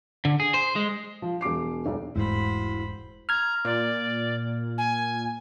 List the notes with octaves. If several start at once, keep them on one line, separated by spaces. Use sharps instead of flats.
D3
G#4
C5
G#3
F3
E1 F#3 D6 C7
E1 B1 E2
E1 G#2 G#3 A3 E4 F#4 C5 B5
A#5 F6 G#6
A#2 D5
G#5